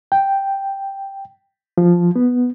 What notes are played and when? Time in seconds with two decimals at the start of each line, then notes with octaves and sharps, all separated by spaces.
0.12 G5
1.78 F3
2.16 B3